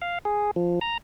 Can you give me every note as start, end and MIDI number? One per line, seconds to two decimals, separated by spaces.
0.02 0.18 77
0.25 0.51 68
0.56 0.79 53
0.81 0.98 82